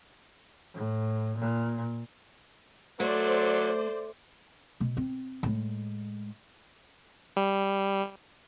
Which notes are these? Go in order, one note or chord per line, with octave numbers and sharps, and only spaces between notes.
A2
A#2
F#3 A3 C5 D5
B2
C4
A2 G#3
G3